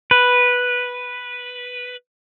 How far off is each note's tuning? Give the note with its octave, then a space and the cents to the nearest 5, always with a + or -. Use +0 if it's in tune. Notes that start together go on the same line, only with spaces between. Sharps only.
B4 -5